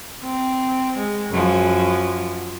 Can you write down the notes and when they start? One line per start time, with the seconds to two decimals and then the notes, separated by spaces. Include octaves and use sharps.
0.24 C4
0.98 G#3
1.31 F#2 F3